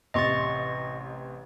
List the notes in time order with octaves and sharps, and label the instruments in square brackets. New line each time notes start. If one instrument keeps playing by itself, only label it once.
[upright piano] A1 C3 C6 [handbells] D#5 C#6 A6